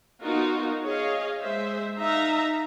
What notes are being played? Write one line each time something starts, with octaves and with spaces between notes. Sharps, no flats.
B3 D#4 F4 F#4 A#4
G#4 C#5 D#5 F5
G#3 G#4 C5 E5
D#4 E5 F5 A#5